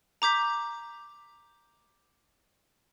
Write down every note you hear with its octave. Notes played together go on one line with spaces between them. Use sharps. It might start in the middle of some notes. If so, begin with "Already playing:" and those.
A#5 D6 G6 B6